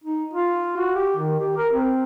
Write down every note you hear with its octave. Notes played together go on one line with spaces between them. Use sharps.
D#4
F4
F#4
G4
D#3
G4
A#4
C4